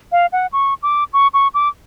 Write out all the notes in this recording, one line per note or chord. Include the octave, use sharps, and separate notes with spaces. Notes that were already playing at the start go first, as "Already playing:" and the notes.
F5
F#5
C#6
D6
C#6
C#6
D6